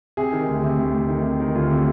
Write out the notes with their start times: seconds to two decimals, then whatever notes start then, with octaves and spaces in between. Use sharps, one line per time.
0.17 C3 G#4
0.32 D#3
0.48 D2
0.64 C3
0.79 D2
0.94 D2
1.09 D#3
1.24 C3
1.40 D#3
1.55 D2 F4
1.70 C3